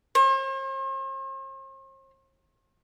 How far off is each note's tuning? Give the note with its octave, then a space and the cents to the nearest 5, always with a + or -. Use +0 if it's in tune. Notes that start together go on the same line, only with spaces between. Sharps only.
C5 +45